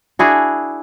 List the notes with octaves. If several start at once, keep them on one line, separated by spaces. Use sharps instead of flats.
D4 E4 F#4 G#4